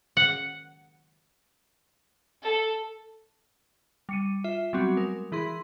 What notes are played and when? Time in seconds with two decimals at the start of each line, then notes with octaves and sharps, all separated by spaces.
0.17 F#5
2.43 A4
4.09 G3 C#7 D#7
4.44 F4 E5
4.73 F#3 G3 B3 C4 F#4
4.97 G#3 A#4
5.32 E3 E4 G#4 C6